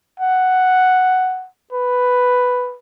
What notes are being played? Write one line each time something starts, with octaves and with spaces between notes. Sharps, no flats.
F#5
B4